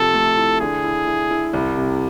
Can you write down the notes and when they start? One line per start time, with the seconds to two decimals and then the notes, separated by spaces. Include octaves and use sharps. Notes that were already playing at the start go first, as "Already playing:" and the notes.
Already playing: C3 F3 A4
0.14 A3
0.37 E4
0.60 D3 G#4
0.84 E4
1.07 E4
1.31 E4
1.53 C2
1.77 C3